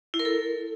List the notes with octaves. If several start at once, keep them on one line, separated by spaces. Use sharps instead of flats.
E4
A#4
A4